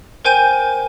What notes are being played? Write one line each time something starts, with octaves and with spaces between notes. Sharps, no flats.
A#4 C5 G5 G#5 G6 D#7